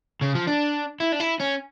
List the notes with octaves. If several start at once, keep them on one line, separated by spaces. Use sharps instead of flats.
C#3
F3
D4
E4
D4
E4
C#4